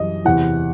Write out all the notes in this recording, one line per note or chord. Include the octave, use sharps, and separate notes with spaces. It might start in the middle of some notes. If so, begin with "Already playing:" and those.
Already playing: F#2 E3 G3 D#5
E2 C3 E3 F#5